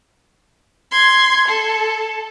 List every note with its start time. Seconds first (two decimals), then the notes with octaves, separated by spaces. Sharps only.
0.91 C6 G#6
1.48 A4